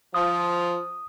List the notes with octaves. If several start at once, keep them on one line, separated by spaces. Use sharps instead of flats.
F3 F4 D#6